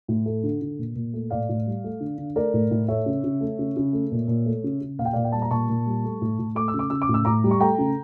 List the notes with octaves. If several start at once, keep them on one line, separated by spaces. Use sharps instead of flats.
A2
A3
D3
D3
A#2
A#2
A3
A2 D5 F5
A2
G3
A3
D3
D3
A3 A#4 D5
A2
A2
A3 C#5 E5
C#3
C#3
A3
C#3
C#3
A3
A#2
A#2
A3
C#3
C#3
A#2 F5
G5
A#2 D5 F5
G5
G3 A5
A#5
A#2 A5 C#6
A#2
G3
A3
A2
A2
A3 D6
E6
C#3
D6
C#3 E6
D6
A2
E6
A2 A#5 D6
G3
C#6
A3 G5 A#5
C#3